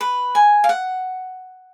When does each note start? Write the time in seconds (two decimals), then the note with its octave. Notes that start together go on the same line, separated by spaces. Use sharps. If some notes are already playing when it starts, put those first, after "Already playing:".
0.01 B4
0.35 G#5
0.64 F5
0.69 F#5